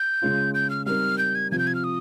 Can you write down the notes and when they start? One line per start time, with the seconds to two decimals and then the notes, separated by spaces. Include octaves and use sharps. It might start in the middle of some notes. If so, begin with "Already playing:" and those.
Already playing: G6
0.22 C#3 G#3 C#4 F4
0.54 G6
0.70 F6
0.86 G3 C4 D#4 A#4 F6
1.18 G6
1.35 G#6
1.51 C3 F3 C4 G#6
1.59 G6
1.67 G#6
1.75 F6
1.84 D#6